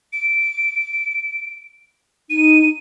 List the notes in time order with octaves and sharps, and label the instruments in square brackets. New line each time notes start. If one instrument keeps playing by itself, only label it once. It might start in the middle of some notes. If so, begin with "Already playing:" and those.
[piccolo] D7
[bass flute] D#4 [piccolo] D#7